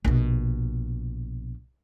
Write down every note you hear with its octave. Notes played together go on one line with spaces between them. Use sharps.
A#1 B2